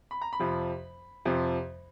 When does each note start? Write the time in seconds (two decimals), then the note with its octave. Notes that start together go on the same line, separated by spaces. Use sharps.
0.11 B5
0.22 A#5
0.33 B5
0.40 F2 C3 F3
1.25 F2 C3 F3